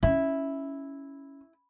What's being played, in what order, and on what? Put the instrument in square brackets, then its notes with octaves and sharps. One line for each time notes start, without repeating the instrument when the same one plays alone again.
[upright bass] C#4 [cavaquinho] E4